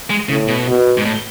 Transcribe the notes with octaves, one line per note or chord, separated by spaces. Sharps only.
G#3
A2 C#3
B2
B2
G#2
A2